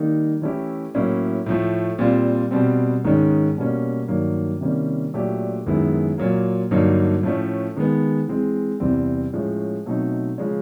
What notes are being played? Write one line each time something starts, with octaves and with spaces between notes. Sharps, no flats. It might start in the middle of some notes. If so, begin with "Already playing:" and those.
Already playing: D#3 G3 A#3 D#4
E3 A3 C#4 E4 G4
A2 F#3 A#3 C#4 E4
A2 F3 A3
A#2 G3 C4 F4
B2 G3 C4
G#2 D#3 G#3 C#4
B2 G3 A#3 C#4
G2 D#3 F#3 A#3 D4
C3 D#3 G3 A#3 C#4
A#2 F#3 A3 D4 G4
F#2 D#3 G#3 B3 E4
A#2 F#3 A#3
G2 D3 F#3 A#3 D#4
A2 F3 A3 C#4
D#3 G#3 B3
E3 G#3 C4
E2 C3 E3 G3 C4
A2 F3 G#3 C#4
B2 F#3 A3 C4 D#4
C#3 F3 G#3 C#4